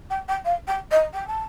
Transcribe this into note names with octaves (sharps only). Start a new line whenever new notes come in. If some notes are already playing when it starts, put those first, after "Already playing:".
G5
G5
F5
G5
D#5
G5
A5